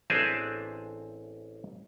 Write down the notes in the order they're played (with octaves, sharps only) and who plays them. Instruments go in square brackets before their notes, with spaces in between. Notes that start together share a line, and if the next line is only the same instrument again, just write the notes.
[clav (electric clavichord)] A1 C4 D4 G#4 E5 A5